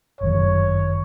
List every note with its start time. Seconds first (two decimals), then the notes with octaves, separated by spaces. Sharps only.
0.21 G1 F#2 D#3 C#5